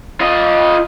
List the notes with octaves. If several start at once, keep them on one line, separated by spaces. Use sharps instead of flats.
F4 D#5